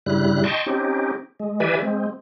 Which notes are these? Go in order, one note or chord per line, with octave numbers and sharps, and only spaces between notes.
G2 C#3 G3 E4 F#6
D#5 G5 A5 C6 C#6
C4 C#4 D#4 G4
G#3
E3 G4 B4 D5 E5 G#5
G#3 C4